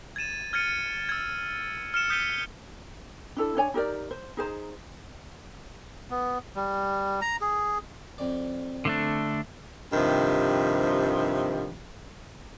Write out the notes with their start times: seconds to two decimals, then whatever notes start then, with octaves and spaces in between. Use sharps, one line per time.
0.16 G#6 A6 D#7 E7
0.53 F6 G#6 A6 C#7 D#7
1.09 E6 G#6
1.94 F6 C#7 E7
2.10 D#6 G6 B6 C#7 D#7 G7
3.36 D4 E4 A4
3.57 D4 C#5 G#5
3.74 D#4 G4 A#4 D5
4.11 C5
4.37 D#4 G#4 C5 A#5
6.10 B3
6.55 G3
7.21 A#5
7.41 G#4
8.18 F2 D5
8.85 D3 A3 D4
9.93 G2 C3 D#3 F3